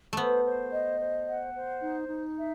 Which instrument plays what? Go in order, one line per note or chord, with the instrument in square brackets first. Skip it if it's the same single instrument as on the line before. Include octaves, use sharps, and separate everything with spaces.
[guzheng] A3 B3 [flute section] C5
[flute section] C5
D#5
C5
F#5
C5
D#4
D#4
E5